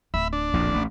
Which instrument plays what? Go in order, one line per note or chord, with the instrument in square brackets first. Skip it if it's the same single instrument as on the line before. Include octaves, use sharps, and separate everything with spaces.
[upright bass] D1 [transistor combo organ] E5 B5
[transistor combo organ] D4
[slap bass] A#1 F2 A2
A1